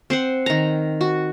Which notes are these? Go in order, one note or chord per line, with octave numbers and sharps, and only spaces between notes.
C4 C5 F#5
D#3 A#5
F#4